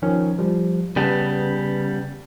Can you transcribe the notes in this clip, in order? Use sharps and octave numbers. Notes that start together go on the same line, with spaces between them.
D#3 F3 C#4
F3 G3
C#3 G3 B3 B4 A5